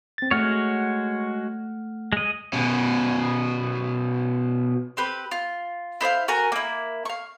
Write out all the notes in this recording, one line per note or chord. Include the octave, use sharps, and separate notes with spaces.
C4 A6
G#3 A3 F#4 C#5 F#5 F6
G#3 D#5
B2 C#4
C4 G4 B4
F4
E4 C5 D#5 F5
F#4 A#4 G#5 A#5
A#3 E4
F5 C#6